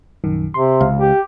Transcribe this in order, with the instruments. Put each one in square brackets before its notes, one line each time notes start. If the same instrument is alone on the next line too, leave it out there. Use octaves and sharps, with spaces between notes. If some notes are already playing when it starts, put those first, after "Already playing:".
[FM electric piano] A#1 F#2 D#3
[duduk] C3 [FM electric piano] C6
[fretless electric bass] C#2 [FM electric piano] F5
[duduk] G4